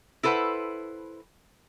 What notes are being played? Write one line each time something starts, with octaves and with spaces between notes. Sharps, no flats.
E4 A4 B4 C5 F#5